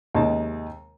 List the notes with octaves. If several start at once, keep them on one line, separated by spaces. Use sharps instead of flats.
D#2 C3 G#3 D#4 A5